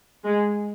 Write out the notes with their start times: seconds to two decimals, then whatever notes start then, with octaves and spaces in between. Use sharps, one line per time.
0.25 G#3